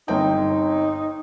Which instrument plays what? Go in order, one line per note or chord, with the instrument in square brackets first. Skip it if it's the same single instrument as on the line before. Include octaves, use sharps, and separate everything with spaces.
[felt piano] G1 C4 G5 [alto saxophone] D#4